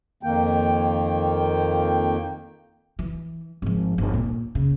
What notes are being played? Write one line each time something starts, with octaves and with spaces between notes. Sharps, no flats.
F2 D#3 A#3 G5
E3
G#1 F3
G1
A#2
C#3